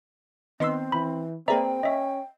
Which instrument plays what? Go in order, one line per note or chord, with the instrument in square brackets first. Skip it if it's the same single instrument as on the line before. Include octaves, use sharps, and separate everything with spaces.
[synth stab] D#3 B3 C6 [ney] C4 [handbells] D#5 E6
[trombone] E3 [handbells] B5
[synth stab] A#3 G#4 B4 [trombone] C4 [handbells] D5 E5 A#5 [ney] G5
[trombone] C#4 [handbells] D#5 E5